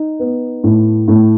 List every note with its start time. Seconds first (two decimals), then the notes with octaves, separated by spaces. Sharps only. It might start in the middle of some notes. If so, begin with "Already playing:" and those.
Already playing: D#4
0.19 B3
0.64 A2
1.08 A2